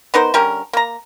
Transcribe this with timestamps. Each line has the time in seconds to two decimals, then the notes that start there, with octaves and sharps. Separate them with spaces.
0.14 B3 D#4 A#4 C5
0.34 D3 G3 C#4 A#4
0.73 A#3 A#5